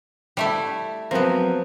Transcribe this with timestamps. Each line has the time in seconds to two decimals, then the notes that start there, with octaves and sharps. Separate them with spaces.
0.37 G3 A3 E4
1.11 F3 F#3 B3 C4 A#4